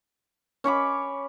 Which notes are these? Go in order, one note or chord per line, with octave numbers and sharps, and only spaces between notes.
C#4 C#5 B5 D6